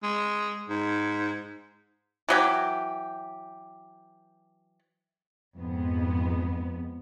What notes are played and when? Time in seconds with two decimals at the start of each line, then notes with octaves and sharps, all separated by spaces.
0.03 G#3
0.69 G#2
2.29 E3 F#3 G4
5.57 F2 G#2 B3